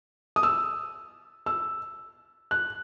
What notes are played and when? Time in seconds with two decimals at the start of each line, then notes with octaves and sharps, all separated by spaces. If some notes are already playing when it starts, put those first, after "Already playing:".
0.36 D#6
0.43 E6
1.46 E6
2.51 F#6